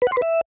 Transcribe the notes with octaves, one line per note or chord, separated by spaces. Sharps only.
B4
F#5
C6
B4
E5